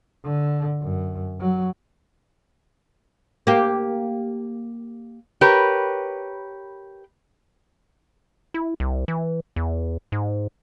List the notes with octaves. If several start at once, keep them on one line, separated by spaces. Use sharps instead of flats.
D3
F#2
F#3
A#3 G4
G4 A#4 B4 C#5
E4
C2
E3
E2
G#2